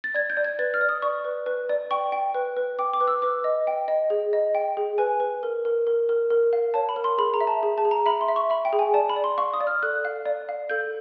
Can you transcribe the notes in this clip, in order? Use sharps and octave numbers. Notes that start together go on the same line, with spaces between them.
A6
D5 G#6
G6
D5
G#6
B4 A6
F6
D5
D#6
D5 C#6
B4
B4
D5
G5 C#6
G5
B4
B4
G5 D6
D6
B4
E6
B4 D6
D#5
G5
D#5
G#4
D#5
G5
G#4
B4 G#5
B4
A#4
A#4
A#4
A#4
A#4
F5
C#5 A5
B5
A#4
C6
G#4 B5
A#5
E5
A5
G#4
A5
G#4
A#5
E5 B5
C6
E5
C#6
E5 B5
G5
G#4
G#5
D5 A5
B5
D5
C6
F5 C#6
D#6
D5
F6
A4 F#6
F5
D5
F5
A4 G6